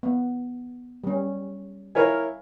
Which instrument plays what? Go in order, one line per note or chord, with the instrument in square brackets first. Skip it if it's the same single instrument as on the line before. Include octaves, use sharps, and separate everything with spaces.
[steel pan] B3
G3 C#4
[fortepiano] E4 A#4 C#5 [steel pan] F5 G#5